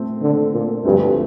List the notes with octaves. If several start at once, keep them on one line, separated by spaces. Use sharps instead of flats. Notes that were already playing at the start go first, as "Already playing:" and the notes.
Already playing: A#2 A3 C4
D3
A#2
D2 G2 D3 F3 C4